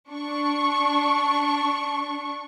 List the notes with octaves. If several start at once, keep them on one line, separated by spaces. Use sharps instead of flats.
D4 C#6